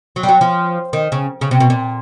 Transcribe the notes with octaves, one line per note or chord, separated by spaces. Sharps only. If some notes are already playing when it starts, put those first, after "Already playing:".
F#3
G3
F#3
F3
D#3
C#3
C#3
C3
B2
A#2